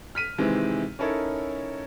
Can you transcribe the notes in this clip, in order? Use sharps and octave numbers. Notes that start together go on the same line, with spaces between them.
F6 B6 D#7
C3 D#3 E3 G#3 C4
C#4 D#4 E4 A4 A#4 C#5